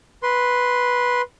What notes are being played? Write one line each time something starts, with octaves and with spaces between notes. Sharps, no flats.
B4 C6